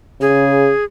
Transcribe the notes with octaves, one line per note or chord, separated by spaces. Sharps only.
C#3 G#4